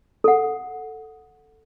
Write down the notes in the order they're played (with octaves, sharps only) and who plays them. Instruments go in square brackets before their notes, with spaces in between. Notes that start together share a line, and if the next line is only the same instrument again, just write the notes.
[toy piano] A4 F#5